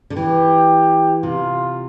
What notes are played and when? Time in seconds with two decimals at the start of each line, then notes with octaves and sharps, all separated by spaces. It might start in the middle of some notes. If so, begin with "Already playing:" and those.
0.10 D3
0.16 E3 G4
1.23 C3 F4